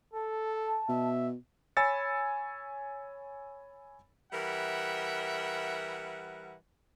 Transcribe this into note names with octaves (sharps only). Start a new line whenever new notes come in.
A4 A5
B2 E5
C#5 G#5 B5 E6 A6 C#7
E3 G3 A#4 E5 F#5